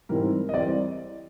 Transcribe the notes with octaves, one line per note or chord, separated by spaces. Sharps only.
G#2 E3 G3 C4 E4 A#4
D#5
E3 G3 C4 D5